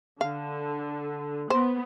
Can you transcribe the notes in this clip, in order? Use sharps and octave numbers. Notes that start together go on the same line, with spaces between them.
D3 F5
B3 C5